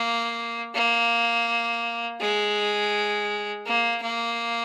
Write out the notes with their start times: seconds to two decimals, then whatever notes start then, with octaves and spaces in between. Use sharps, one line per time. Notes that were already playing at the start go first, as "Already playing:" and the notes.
Already playing: A#3
0.74 A#3
2.20 G#3
3.66 A#3
4.02 A#3